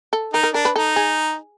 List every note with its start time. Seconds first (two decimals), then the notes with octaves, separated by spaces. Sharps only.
0.13 A4
0.33 D#4 A#4
0.43 A#4
0.54 D4 A#4
0.65 B4
0.76 D#4 A4
0.96 G#4